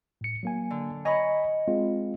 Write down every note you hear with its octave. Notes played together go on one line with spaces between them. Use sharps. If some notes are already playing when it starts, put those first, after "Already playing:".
A2 C#7
F#3 A#3 G#5
D3
C#5 D#5 G#5 A#5 B5
G#3 C4 F4